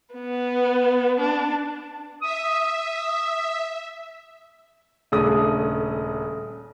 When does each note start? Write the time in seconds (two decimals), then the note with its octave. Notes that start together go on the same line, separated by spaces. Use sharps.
0.13 B3
1.20 D4
2.22 E5 D#6
5.12 D#1 C#3 A3 D4 D#6